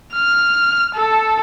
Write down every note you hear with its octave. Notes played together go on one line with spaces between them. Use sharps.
F6
A4